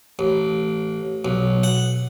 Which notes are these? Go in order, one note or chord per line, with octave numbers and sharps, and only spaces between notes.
A1
B1
F#5